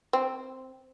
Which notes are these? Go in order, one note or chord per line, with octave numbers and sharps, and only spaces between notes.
C4